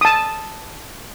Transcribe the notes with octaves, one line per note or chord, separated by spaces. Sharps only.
A5 D#6